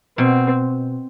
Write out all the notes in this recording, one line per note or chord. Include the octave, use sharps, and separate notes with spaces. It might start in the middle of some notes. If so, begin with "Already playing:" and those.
B2 C4